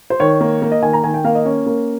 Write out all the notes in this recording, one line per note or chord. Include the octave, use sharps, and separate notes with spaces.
C5
D#3 C#5
A#3
A#3
D#5
D#3 G#5
A#5
D#3 G#5
G5
A#3 F5
D#5
C#4 C#5
A#3